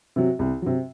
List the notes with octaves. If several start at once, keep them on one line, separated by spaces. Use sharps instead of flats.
C3 F#3
C2
C3 F#3